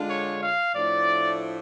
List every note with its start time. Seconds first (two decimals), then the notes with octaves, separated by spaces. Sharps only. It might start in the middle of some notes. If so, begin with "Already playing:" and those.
Already playing: D3 G#3 D4 F4
0.09 C#5
0.42 F5
0.74 A2 F3 A3 D4 D5